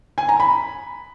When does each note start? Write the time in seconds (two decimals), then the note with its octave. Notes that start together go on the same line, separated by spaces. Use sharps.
0.18 G#5
0.29 A#5
0.40 B5